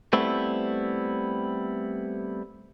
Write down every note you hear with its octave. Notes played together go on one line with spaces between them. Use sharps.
G3 A3 B3 C4 E4